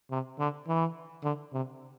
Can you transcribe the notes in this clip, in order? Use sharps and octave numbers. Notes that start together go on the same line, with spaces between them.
C3
D3
E3
D3
C3